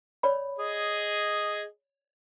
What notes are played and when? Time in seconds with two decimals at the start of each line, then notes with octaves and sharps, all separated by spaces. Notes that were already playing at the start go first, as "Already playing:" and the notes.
0.23 C#5 D5 B5
0.58 G#4 D#5